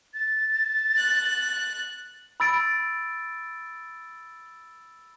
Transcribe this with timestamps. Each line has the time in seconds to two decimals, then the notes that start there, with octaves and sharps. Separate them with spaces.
0.14 A6
0.97 F#6
2.40 B5 E6 A6 D7